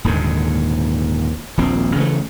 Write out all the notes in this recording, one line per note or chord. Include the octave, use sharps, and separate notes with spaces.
D#1 D#2 G#2 D3
D#1 A#1 C4
C#3 E3 F#3 A3